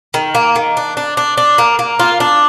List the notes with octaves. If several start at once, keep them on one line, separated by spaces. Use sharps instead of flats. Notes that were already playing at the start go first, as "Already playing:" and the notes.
D#3
A#3
D#3
D4
D4
D4
D4
A#3
A#3
F4
D4